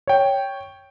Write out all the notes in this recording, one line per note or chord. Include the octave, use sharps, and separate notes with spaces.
C#5 G5